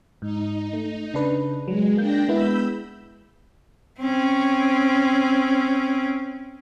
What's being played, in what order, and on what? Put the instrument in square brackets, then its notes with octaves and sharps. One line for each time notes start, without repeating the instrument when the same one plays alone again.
[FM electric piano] G#2 [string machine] D#4
[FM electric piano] A3
C#3 D4 B4
[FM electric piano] F#3 [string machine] G#3
[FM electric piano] A#3 G6 [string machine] D4 G5 A#6
[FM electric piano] G#3 B3 E4 [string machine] B5 E6 G6
[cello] C4 C#4